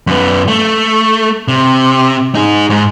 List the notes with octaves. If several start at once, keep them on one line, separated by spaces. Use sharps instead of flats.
F#2 B3
A3
C3
D#4 G#4
G#2